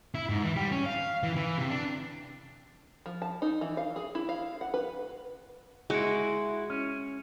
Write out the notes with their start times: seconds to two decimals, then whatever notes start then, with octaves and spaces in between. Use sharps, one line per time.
0.15 E4
0.30 G#2
0.44 E3
0.56 G3
0.72 C#4
0.86 F5
1.23 E3
1.36 E3
1.58 C3
1.70 D4
3.06 F3
3.22 A5
3.42 D#4
3.61 E3
3.77 F5
3.96 G#4
4.15 E4
4.29 F5
4.61 F#5
4.74 B4
5.90 G#3 E4 F#4
6.70 C#4